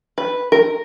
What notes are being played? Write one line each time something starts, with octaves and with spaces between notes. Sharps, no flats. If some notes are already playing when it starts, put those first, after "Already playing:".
B4
A#4